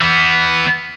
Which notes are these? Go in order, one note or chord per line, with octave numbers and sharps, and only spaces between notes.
E3 B3